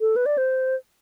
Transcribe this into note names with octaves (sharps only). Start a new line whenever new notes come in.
A4
B4
D5
C5